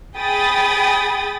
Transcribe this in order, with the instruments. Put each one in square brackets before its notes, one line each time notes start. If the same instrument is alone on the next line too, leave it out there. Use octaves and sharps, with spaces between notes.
[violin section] G#4 G5 B5 D#6 A6